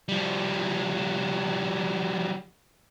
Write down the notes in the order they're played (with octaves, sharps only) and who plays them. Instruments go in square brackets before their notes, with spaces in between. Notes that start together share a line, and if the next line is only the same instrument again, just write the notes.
[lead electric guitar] F3 G3